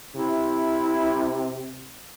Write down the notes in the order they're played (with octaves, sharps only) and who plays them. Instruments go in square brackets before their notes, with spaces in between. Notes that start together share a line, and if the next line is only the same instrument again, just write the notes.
[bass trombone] C3 [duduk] E4